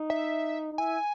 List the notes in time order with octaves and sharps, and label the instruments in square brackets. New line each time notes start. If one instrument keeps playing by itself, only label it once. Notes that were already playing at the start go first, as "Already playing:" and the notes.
Already playing: [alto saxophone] D#4
[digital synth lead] E5
[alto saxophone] D#4
[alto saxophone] E4 [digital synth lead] G#5